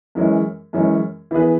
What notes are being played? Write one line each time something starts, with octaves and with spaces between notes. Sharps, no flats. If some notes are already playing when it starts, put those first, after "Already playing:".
F#2 E3 G#3 C#4
F#2 E3 G#3 C#4
E3 B3 G#4 B4